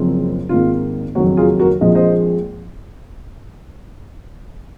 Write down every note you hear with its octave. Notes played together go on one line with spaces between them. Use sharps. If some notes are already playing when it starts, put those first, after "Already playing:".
Already playing: F#1 F#2 C#3 F3 C4
G#1 G#2 D#3 A#3 F4
F#1 F2 D#3 F#3 F#4
F4 G#4
F#4 A#4
A#1 A#2 F3 G#3 C4 D#5
C5 D#5